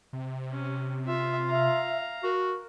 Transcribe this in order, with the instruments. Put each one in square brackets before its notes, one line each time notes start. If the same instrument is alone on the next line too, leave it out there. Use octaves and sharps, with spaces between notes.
[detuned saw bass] C3
[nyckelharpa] C#4
[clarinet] F4 [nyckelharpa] E5
[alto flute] E5 [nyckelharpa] F5 A#5
[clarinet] F#4 [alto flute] A#4